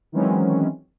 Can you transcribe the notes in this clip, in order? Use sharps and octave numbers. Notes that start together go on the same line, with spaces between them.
D#3 E3 F#3 G#3 C4 C#4